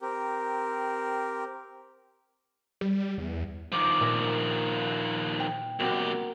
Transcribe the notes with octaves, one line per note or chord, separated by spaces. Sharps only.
C4 G4 A#4
G3
E2
D#3 F3 D6
A#2 E5 A#5
G5
B1 A#3 C4 F#4 G4